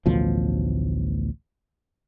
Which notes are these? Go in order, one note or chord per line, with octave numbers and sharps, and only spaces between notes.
A1 D2 B2 F3